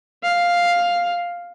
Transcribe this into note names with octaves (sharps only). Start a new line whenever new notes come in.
F5